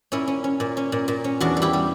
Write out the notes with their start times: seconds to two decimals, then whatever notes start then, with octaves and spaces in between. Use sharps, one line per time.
0.12 A#2 C#4 E4
0.28 C#4
0.44 C#4
0.60 A#2
0.77 C#4
0.92 A#2
1.08 A#2
1.24 C#4
1.40 E2 D4 F#4
1.57 G3
1.62 E4 G4
1.73 G3